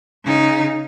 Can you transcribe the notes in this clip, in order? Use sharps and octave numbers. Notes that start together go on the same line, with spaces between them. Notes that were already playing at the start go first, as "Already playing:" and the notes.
C#3 D#4